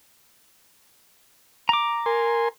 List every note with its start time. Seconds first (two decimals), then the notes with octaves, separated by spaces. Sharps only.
1.69 A#5 D6
2.06 A#4 G#5 C6